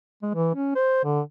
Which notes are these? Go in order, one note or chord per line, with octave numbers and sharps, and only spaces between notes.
G#3
E3
C#4
C5
D3